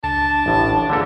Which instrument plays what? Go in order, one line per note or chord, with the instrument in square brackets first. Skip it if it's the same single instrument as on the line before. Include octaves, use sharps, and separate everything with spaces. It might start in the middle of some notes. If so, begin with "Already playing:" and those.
[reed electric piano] C#2 [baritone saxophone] D4 [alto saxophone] A5
[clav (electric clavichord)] A1 A2
[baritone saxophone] C#2 [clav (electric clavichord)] D3 A#3 A4